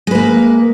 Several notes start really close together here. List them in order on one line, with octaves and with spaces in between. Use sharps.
G#3 B4 A#3